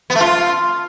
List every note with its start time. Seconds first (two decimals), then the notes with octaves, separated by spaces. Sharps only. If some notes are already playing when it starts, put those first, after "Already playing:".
0.10 B3
0.15 A3
0.20 F4